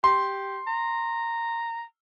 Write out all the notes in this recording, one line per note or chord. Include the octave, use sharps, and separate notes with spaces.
G4 C6
A#5